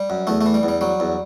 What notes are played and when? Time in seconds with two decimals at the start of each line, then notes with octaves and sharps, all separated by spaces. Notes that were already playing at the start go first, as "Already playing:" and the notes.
Already playing: G3
0.10 F#2
0.27 E2 A3
0.41 A3
0.46 E3
0.54 G3
0.63 E2
0.68 G3
0.81 F#3 G3
1.00 E2